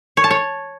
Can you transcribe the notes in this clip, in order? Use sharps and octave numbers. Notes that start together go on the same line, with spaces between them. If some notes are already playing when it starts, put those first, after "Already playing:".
C#5
A5
C#5